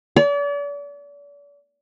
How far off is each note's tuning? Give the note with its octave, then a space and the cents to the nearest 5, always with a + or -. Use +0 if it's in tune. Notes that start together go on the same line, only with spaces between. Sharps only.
D5 -40